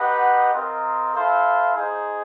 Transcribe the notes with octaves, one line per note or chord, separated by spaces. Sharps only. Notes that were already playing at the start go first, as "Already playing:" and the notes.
Already playing: D#4 G4 B4 D#5 F#5
C4 F4 A#4 D#5
E4 A4 C5 F5
D#4 G#4 C5